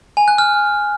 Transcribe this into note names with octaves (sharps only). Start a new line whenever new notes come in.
G#5
F#6
F6